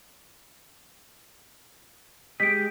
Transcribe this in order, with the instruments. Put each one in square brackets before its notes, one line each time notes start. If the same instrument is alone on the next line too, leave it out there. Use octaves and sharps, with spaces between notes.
[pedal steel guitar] G#3 G4 D#5 [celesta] B6 D7